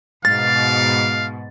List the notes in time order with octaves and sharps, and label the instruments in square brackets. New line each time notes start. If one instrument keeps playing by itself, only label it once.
[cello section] G#2 B2 [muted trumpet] F5 [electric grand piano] A6